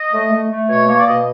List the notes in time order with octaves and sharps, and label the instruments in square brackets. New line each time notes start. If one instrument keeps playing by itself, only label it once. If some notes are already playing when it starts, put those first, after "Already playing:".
Already playing: [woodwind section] D#5
A3
A3
A3
B2 C#5
A#3 C#5
D5
B2 D#5